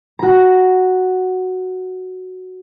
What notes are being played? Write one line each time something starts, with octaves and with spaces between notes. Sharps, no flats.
F#4 A#5